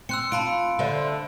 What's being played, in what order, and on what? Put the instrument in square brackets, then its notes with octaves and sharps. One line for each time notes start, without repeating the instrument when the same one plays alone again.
[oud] C4 [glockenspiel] E6 F#6 C#7
[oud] F4 [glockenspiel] A5 B5 D7
[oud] D3 C5 E5